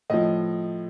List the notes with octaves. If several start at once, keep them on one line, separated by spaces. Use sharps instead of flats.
A2 F3 D#5